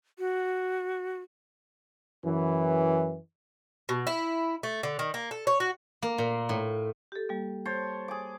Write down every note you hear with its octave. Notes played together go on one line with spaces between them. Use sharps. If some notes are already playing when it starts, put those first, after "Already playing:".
F#4
F#2 E3
B2
E4
A3
D3
D#3
A#3
A4
C#5
F#4
A#3
A#2
A2
G4 A4
G3 A#3
C5 C#5 A5
G#4 D6